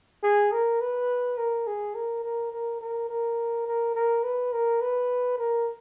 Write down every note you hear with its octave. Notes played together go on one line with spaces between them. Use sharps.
G#4
A#4
B4
A#4
G#4
A#4
A#4
A#4
A#4
A#4
A#4
A#4
B4
A#4
B4
A#4